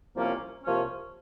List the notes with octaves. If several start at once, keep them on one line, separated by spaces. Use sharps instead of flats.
C2 C3 F3 A#3 C#4
C2 C3 F3 A#3 C#4